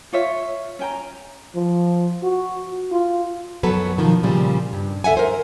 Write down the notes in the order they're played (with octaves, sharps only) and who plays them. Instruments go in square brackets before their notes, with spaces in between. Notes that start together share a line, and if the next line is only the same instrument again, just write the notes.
[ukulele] F4 C#5 E5
C#4 G5 A#5
[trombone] F3
F#4
F4
[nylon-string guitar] F#2 F#3 B3 A4 B4
B2 D#3 F3
A#2 C#3 F3 G3
G2
D2 A4 E5 F#5 G#5
A#4 C5